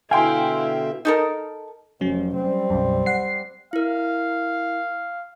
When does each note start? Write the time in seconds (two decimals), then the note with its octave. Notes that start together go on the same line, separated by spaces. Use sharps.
0.11 B2 D3 E4 E5 F5 G5 G#5 C6
1.05 D#4 A4 A#4
2.01 F1 F#3 C#4
2.36 G3 C4
2.70 B1 F#2
3.06 F#5 C7
3.73 E4 A#4 F5